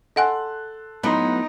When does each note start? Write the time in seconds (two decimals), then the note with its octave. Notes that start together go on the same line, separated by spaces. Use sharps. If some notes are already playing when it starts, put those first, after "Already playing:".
0.16 A4 D#5 F#5 G#5 C6 F#6
1.03 A2 F#3 B3 D#4 B5 C6